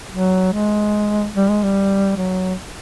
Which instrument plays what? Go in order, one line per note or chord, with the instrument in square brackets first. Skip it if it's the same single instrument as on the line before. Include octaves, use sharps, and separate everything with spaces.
[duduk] F#3
G#3
G3
G#3
G3
F#3